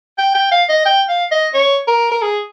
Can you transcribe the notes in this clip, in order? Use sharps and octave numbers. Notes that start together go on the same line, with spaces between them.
G5
G5
F5
D#5
G5
F5
D#5
C#5
A#4
A#4
G#4